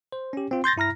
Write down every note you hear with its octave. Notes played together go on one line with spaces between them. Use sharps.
C5
C#4 G4
C4 F4
C6 G6 A6 A#6
G2 E4 A#5 F6 A#6